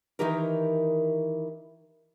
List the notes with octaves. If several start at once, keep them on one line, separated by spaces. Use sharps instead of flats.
D#3 E3 D#4 G4 A#4